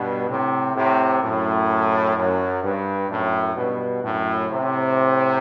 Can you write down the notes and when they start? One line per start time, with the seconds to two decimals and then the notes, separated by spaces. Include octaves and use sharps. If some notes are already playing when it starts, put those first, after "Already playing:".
Already playing: G2 B2
0.29 A2 C3
0.76 A2 C3
1.23 F#2 A2
2.16 F#2
2.63 G2
3.09 F#2 A2
3.56 G2 B2
4.03 F#2 A2
4.50 A2 C3